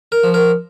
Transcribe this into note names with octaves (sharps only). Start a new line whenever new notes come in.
A#4
F3
A#4